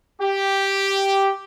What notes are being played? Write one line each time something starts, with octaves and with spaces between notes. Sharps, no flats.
G4